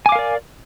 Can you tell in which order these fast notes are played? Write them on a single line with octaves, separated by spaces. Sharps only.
G#5 D6 F5 A#4 D5